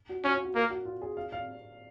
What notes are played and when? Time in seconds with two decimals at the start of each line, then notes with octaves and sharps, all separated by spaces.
0.09 F#4
0.24 C#4 F#4
0.35 F4
0.44 F#4
0.55 A#3 A#4
0.70 F#4
0.85 F4
1.02 G#4
1.17 F5
1.32 F5